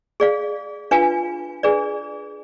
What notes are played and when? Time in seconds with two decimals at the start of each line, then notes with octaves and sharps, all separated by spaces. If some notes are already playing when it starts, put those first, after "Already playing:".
0.20 G#4 D5 F5
0.91 D4 F4 B4 F5 G#5
1.63 D4 G#4 B4 D5